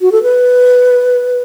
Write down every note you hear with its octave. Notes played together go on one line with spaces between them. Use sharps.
F#4
A4
B4